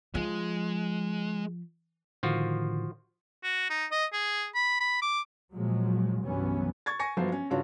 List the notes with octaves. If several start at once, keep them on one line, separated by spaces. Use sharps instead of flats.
F3 G#3
A2 D3 D#3 F3 F4 F#4
F#4
D#4
D#5
G#4
B5
B5
D6
A#2 F3 F#3 G#3
C2 G2 E3 F#3 B3 C#4
C#6 G#6 A6
G#5 C#6 A#6 C#7
G1 F3 F#3 C5
C#4
G2 C#3 F4 F#4 C#5